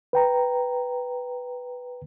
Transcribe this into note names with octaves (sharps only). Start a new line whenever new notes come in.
B4 G5 A#5